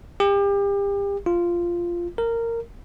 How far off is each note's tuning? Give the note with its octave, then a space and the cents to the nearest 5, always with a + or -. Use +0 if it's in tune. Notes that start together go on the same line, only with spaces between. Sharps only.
G4 +35
F4 -10
A#4 -15